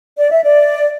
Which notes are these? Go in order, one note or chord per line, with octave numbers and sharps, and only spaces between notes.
D5
E5
D5